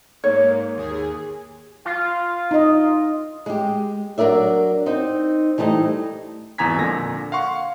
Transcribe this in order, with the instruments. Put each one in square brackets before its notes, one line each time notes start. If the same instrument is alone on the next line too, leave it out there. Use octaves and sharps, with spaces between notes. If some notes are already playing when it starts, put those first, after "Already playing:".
[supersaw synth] G#2 A#3 [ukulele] C#5
[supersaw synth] D#2 G#4
[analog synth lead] F4 [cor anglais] F5
[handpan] D#4 D#5
[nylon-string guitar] G#3 G4
F#3 D4 A#4 D5 E5
C4 D#4
E3 G3 A3 D#4 C5
[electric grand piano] G#1 E2 G#5 A#5 G#6 B6
F2 A#2 D3 A#6
F5 F#5 C6 C#6